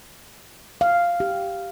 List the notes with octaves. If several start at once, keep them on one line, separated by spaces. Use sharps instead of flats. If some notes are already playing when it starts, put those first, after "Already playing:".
F5
G4